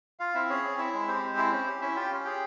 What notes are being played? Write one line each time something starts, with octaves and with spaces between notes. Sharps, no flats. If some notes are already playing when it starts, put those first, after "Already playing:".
F4 F5
C4 E4 E5
C#4 G#4 C#5
C4
E4 E5
G#3
C4 G4 C5
G#3
E4
C#4
G4
C#4 E4 E5
F4 G4 G5
C#4
G4 G#4 G5